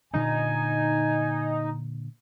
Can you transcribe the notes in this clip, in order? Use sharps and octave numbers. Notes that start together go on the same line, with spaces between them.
A#2 D3 D4 D#4 G#5